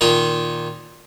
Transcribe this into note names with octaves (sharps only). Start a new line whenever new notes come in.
A#2 D#3 F4 G#5